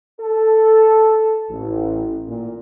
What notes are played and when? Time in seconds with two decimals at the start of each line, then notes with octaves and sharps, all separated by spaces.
0.21 A4
1.50 A1
2.28 A#2